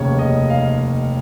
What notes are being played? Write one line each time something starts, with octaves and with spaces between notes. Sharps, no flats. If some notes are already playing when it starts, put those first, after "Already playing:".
Already playing: F1 D#2 C#3 C#5
D#5
F5